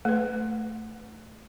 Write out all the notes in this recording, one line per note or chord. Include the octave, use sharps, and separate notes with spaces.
A3 B4